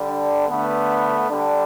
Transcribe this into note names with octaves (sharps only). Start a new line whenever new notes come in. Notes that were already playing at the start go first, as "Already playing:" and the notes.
Already playing: D3 G3
D4
D3 A3 B3
D3 G3 D4